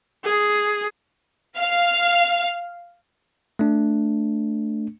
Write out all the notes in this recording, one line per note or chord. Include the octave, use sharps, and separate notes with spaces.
G#4
F5
A3 D4